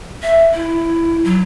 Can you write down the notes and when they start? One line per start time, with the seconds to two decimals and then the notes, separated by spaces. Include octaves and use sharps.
0.23 E5
0.54 E4
1.25 F#3